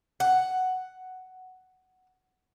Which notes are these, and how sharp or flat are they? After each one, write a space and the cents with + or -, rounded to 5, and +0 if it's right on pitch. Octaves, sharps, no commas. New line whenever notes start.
F#5 +5